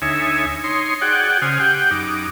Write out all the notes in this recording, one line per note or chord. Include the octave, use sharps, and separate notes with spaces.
D2 D#4 C#5 E5 G#5
D#4 C#5 C6
F#4 G#4 D5 F#5 G5
C#3 C5 G#5 D#6 F6
G4 F#5 G5
F#2 D#4 D6